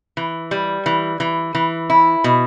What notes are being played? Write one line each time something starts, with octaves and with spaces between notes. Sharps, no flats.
E3
G3
E3
E3
E3
E4
B2